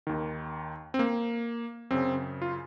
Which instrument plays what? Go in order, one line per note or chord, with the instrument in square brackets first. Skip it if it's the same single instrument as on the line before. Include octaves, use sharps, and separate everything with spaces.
[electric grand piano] D#2 D#3
C4
A#3
F#2 C#3 C4
F4